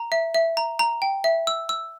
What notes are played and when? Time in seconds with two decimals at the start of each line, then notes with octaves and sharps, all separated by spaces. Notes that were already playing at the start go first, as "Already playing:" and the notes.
Already playing: A#5
0.12 E5
0.34 E5
0.57 A#5
0.79 A#5
1.02 G5
1.24 E5
1.47 E6
1.69 E6